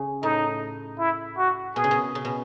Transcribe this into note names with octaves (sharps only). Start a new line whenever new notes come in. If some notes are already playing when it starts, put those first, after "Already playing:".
Already playing: C#3
A2 D#4
E4
F#4
B2 G#4
C#3
B2
C#3
B2